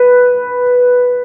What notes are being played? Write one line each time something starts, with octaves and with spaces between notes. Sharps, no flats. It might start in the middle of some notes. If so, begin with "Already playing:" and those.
Already playing: B4